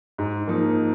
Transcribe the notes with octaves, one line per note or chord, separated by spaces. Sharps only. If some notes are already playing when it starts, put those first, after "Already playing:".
G#2
F3 A#3 D#4